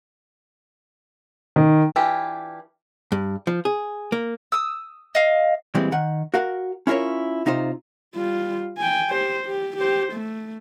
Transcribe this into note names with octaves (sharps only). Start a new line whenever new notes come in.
D#3
E3 D4 E4 F4 G4
G2
F3
G#4
A#3
D#6 E6
D#5 F5
A#2 E3 G3 G#3 C4
D#3 F#5
F#4 A#4 F5 F#5
C#4 E4 F4 A#4 C#5
C3 D#4 F4 C5
G3 F4
G5 G#5
G4 C5
G4
G4 C5
A3